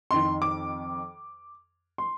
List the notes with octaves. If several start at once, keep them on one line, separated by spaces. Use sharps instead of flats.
F2 D#3 C6
D6
C6